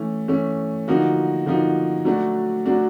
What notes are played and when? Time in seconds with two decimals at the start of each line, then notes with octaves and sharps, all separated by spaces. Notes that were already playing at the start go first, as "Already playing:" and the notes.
Already playing: E3 A3 C#4
0.28 E3 A3 C#4
0.88 D3 F3 A#3 D#4 F#4
1.46 D3 F3 A#3 D#4 F#4
2.05 F#3 A3 D4 F#4
2.65 F#3 A3 D4 F#4